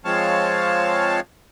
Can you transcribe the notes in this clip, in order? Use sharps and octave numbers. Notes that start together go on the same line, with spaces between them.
F3 G#3 C4 C#5 F5 A5